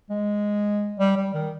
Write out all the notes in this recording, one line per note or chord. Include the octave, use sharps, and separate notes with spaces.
G#3
G3
G3
D#3